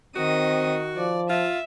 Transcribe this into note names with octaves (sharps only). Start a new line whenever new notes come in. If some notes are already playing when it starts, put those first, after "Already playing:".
D#3 C4 F#4 D#5 D#6
F3 D5
F4 E5